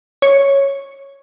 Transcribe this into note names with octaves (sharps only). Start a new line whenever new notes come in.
C#5 C#7